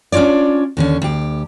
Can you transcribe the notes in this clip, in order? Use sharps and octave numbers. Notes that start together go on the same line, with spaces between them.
C#4 D4 F4 C#5 D5
D#2 D3 C#4
D2 G4